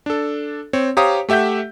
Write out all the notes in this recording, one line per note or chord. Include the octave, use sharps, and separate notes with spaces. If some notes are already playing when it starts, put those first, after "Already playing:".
D4 A4
C4 C#5
G4 C5 C#5 F5 A#5 D#6
A3 G4 E5 F#5 G6